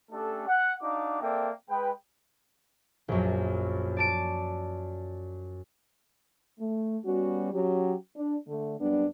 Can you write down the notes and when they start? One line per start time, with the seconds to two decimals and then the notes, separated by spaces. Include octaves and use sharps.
0.11 A3 C#4 D4 G4 A4
0.48 F#5
0.83 D4 D#4 F#4 F5 D6
1.21 A#3 C4 A4 D5 E5 G5
1.69 G#3 B4 G5
3.08 A#1 F#2
3.97 D5 A5 D7
6.59 A3
7.04 G3 B3 C#4 F#4
7.52 F#3 C#4 F#4 G4
8.16 D4
8.48 D3 A3
8.80 F#2 G3 B3 D4